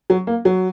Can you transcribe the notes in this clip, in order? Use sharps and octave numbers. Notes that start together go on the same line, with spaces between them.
F#3
A#3
F#3